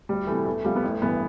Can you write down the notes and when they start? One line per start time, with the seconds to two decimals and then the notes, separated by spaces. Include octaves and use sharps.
0.09 D2 G3
0.27 C3 E3 A3
0.46 E2 A3
0.65 C3 F3 G3
0.76 B3
0.83 A1 A3
1.02 G2 E3 B3